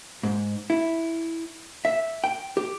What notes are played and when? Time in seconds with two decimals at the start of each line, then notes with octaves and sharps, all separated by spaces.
0.23 G#2
0.70 E4
1.85 E5
2.24 G5
2.57 G4